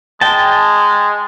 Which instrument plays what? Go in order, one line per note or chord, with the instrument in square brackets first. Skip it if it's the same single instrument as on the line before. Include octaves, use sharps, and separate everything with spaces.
[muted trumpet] G#3 [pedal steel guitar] G5 A5